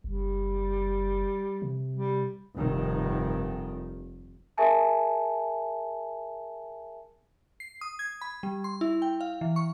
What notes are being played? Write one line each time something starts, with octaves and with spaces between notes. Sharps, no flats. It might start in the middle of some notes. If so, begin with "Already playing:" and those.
F#1 G3
C3
G3
F1 G2 D#3
G#4 A#4 E5 G#5 A5
C7
D#6
G#6
B5
G3
C6
E4
G5
F5
E3
C#6